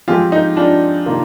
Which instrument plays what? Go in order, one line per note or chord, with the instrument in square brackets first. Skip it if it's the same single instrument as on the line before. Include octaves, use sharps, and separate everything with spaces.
[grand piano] F3 G#3 C4 G4 [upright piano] F4 G#4
[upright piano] D#4
D4 F4
[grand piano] C3 D#3 A#3 F4